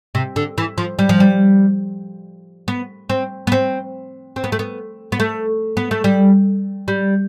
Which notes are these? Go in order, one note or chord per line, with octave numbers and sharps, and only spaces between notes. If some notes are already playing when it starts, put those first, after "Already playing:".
C3
D3
E3
F3
G3
F3
G3
B3
C4
B3
C4
C4
B3
A3
B3
B3
A3
B3
A3
G3
G3